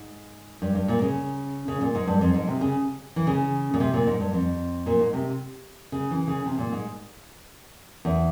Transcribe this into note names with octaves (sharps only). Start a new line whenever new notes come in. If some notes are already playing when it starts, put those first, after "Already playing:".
Already playing: G#2
G2
G2
A#2
C#3
C#3
A#2
G#2
G2
F2
G#2
C3
C#3
E3
C#3
A#2
C3
A#2
G#2
G2
F2
A#2
G#2
C3
C#3
E3
C#3
C3
A#2
G#2
E2